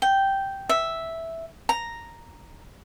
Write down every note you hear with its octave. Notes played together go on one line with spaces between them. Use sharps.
G5
E5
A#5